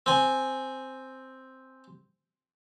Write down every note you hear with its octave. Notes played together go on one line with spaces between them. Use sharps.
C4 G#5